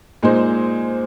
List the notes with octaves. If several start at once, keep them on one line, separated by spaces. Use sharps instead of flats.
A#2 G#3 D#4 G#4 C5